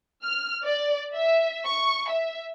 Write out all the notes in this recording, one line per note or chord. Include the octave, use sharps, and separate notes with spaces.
F6
D5
E5
C#6
E5